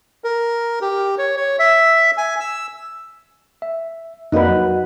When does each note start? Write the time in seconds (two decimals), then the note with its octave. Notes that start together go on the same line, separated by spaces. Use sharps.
0.24 A#4
0.81 G4
1.18 C#5
1.37 C#5
1.59 E5
2.18 G#5
2.40 E6
3.62 E5
4.32 F2 A#3 D#4 F#4 B4 D5 D#5 F#5
4.48 F#3